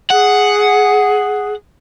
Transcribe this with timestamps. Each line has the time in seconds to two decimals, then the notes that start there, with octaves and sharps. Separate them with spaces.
0.11 G#4 F#5